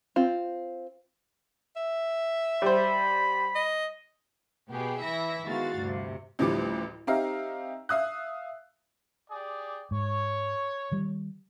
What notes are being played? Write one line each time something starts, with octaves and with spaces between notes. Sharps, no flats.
C4 F4
E5
G3 C5 B5
D#5
B2 B3 G4 G#4
E3 E4 E5 A#6
D#3 G#3 B3 F#4 F5 A6
D2 G2 C3
A1 D2 A2 F3 G3 D6
C4 D#4 G4 E5 F5 A#5
E5 F5 D#6 F#6
G4 G#4 D5
G#2 C#5
D#3 G3